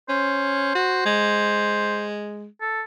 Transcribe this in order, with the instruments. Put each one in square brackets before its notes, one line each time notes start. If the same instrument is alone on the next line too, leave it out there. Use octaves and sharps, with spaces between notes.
[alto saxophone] C#4 [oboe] C5
[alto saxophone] F#4
G#3
[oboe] A4